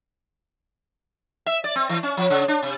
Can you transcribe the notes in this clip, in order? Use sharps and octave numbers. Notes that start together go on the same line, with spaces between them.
E5
D5
C4
E3
C#4
F3
C#3
D4
C3